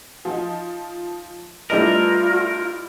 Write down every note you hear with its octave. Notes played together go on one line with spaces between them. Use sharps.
F3 D#4
G3 A3 D4 E4 F4 A#4 B4 D#5